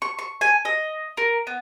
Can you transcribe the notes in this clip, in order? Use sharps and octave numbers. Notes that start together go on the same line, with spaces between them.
C#6
C#6
G#5
D#5
A#4
B3